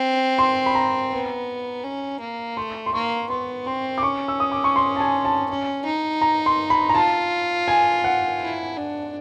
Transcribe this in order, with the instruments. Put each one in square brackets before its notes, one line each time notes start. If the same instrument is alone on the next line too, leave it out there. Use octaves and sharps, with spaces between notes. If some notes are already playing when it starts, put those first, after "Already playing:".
Already playing: [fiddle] C4
[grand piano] C6
B5
A#5
[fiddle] B3
C#4
A#3
[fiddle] A3 [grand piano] C6
[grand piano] C6
[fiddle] A#3 [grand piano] C#6
[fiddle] B3 [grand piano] C6
[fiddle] C4 [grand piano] C6
[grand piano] D6
[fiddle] C#4 [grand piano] C#6
[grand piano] E6
D#6
D6
C#6
C6
A5
G#5
A5
[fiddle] C#4
D#4
[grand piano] A#5
C6
B5
A#5
[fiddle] F4 [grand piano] A5
[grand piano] G#5
F#5
[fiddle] E4
D4